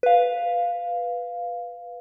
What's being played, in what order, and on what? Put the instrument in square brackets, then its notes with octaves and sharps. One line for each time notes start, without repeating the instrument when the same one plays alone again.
[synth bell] B4 F5